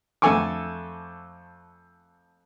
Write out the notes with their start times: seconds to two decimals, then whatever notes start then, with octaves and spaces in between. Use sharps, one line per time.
0.22 F2 A3 A4 G#5 C#6 D6